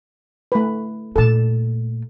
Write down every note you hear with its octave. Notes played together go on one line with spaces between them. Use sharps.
A3 B4
A#2 A3 A4 A5